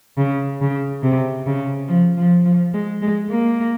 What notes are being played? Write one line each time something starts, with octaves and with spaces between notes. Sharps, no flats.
C#3
C#3
C3
C#3
F3
F3
F3
G#3
G#3
A#3